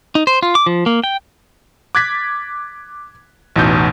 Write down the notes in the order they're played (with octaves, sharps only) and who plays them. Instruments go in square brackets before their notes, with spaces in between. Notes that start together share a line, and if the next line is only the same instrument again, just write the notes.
[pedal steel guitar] D#4
C5
F4
D6
F3
A#3
G5
[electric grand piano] D6 F#6 G#6 A6 B6
A1 E2 B2 D#4 G6